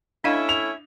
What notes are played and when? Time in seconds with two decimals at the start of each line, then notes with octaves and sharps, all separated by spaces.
0.24 A3 C#4 D4 E4 D#5 F5
0.49 F7